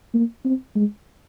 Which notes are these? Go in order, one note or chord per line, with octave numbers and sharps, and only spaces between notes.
A#3
C4
G#3